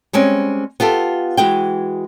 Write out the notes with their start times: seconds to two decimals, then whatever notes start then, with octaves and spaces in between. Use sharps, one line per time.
0.13 G3 G#3 C4 C#4
0.80 B3 F4 G4 A4
1.37 E3 G#3 F#4 G5